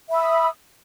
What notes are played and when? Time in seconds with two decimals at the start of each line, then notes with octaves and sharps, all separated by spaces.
0.09 E5
0.11 B5
0.14 E6
0.17 D#6